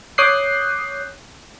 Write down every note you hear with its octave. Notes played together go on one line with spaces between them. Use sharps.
C#5 D6 D#6 F#6 G6 C7